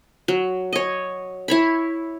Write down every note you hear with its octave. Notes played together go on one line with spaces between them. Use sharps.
F#3
C#5 D#5
E4 C#5 B5